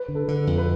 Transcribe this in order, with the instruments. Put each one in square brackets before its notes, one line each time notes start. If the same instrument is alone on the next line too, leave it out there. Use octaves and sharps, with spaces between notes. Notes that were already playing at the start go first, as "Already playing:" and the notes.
Already playing: [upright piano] B4
[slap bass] D3
[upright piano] A4
[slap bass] D3
F2
[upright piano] B4